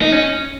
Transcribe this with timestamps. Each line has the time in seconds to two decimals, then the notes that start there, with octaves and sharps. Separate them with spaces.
0.02 D#4
0.12 C#4